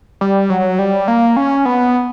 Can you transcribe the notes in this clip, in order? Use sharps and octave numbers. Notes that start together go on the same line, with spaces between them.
G3
F#3
G3
A#3
C#4
B3